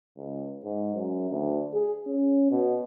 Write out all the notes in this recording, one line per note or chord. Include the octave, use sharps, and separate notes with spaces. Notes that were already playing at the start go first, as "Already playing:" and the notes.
C#2
G#2
F#2
D2
G#4
C#4
B2